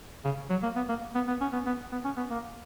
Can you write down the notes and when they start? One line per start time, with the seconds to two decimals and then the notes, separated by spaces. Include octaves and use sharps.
0.24 C#3
0.50 F#3
0.63 A#3
0.75 B3
0.89 A#3
1.15 B3
1.27 B3
1.41 C#4
1.53 B3
1.66 B3
1.92 B3
2.04 C#4
2.17 B3
2.30 A#3